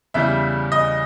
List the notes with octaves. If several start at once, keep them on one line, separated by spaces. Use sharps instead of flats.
E2 C#3 E3 G3 E5
D#5